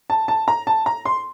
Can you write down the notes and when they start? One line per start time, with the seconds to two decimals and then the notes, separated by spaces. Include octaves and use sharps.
0.10 A5
0.28 A5
0.48 A#5
0.67 A5
0.86 A#5
1.05 C6